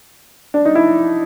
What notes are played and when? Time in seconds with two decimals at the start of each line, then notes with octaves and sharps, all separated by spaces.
0.54 D4
0.65 D#4
0.75 E4